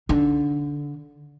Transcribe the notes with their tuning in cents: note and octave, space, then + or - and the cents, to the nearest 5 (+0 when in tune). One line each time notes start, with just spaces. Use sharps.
D3 -15 D#4 -15